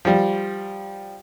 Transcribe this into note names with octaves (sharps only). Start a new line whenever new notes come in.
F3 G3